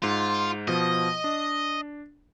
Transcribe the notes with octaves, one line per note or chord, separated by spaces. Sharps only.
G#2 F4
B2 F3 D#5
D4